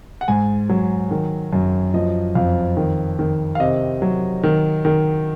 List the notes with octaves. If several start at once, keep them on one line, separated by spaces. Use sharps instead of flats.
F#5
G#2 G#5
F#3
D#3
F#2
F3 D#5
F2 F5
D#3
D#3
F5
C3 D#5
F#3
D#3
D#3